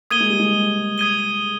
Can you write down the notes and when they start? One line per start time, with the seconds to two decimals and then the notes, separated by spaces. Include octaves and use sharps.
0.11 A#3 D#6 G#6 D#7 G7
0.20 G#3
0.30 G3
0.39 G#3
0.98 D#6 G#6 D#7 G7